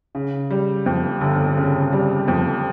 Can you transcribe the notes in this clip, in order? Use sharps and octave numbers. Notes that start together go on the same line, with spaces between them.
C#3
G3
F2
G1
C#3
G3
F2